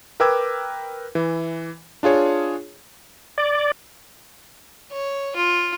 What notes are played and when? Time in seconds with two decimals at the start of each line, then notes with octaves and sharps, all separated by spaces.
0.20 A#4 B4 G5 D6 E6 G#6
1.15 E3
2.03 D4 F4 G#4 C#5
3.38 D5
4.92 C#5
5.36 F4